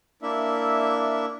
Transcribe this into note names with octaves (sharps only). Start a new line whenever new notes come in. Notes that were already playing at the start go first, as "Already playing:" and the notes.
A#3 D4 E4 E5